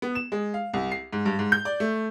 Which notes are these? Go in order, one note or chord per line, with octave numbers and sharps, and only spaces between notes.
B3
E7
G#3
F5
C2
C7
G#2
G2
G#2
G6
D5
A3